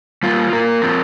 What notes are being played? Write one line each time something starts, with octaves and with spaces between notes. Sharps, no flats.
G3 A#3 F4
A#2 A#3 A#4
F3 C4